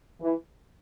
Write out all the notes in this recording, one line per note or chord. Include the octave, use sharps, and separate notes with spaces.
E3